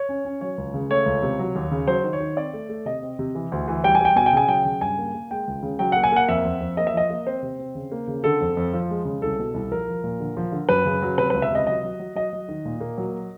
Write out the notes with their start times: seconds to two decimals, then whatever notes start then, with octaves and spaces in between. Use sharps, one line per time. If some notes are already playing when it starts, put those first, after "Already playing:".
Already playing: C#5
0.09 C#4
0.25 C#4
0.41 F#3 C#5
0.58 C#2
0.74 C#3
0.90 A3 C#5
1.06 C#2
1.22 C3
1.39 F#3
1.55 D#2
1.71 C#3
1.87 F#3 C5
2.04 D#3
2.13 C#5
2.20 D#3
2.36 C4 D5
2.53 A3
2.69 A3
2.86 C3 D#5
3.02 C4
3.19 C3
3.35 E3
3.52 D2
3.68 E3
3.84 G3 G5
3.95 G#5
4.01 G3 G5
4.16 B2 G#5
4.26 G5
4.33 C#3 G#5
4.48 F#3 G5
4.65 C#3
4.81 G2 G#5
4.98 A#3
5.14 A#3
5.31 G#3 G5
5.48 C#2
5.63 C#3
5.79 F#3 G5
5.92 A#3 F#5
6.03 G#5
6.12 A#3 F#5
6.28 F2 E5
6.45 F2
6.61 F2
6.77 A#3 D#5
6.87 E5
6.93 F3 D#5
7.10 A#3
7.27 C4 C5
7.42 C3
7.59 C4
7.75 C#3
7.91 A#3
8.08 C#3
8.24 D3 A4
8.41 F2
8.57 F2
8.73 F3
8.90 G#3
9.05 C#3
9.22 C2 A4
9.39 B2
9.54 C2
9.71 F3 A#4
9.88 F3
10.04 A#2
10.20 D3
10.37 F3
10.52 D3
10.69 F#2 B4
10.85 C#3
11.02 F#3
11.18 C3 B4
11.30 C#2 B4
11.42 E5
11.51 C3 D#5
11.67 F#3 D#5
11.84 F#3
11.99 F#3
12.15 F#3 D#5
12.33 F#3
12.49 D#3
12.65 A#2
12.81 A#3
12.98 F#3